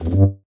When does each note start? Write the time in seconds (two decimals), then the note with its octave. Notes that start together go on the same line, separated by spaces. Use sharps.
0.02 E2
0.08 F2
0.13 G2